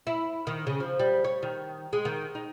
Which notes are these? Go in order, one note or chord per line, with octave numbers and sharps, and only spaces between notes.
E4
D#3
C#3
F3
G3
C#5
D#3
G#3
D#3
D#4